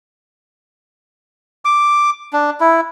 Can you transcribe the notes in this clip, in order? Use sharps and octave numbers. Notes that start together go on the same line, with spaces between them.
D6
D4
E4